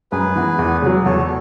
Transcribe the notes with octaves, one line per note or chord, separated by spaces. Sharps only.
F#2 G#4 B4
E3 B3
E2
C#3 F#3
E2 A4 C#5